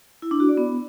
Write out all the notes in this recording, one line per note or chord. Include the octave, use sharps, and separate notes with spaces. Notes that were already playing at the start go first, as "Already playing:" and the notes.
E4
D4
F#4
D5
B3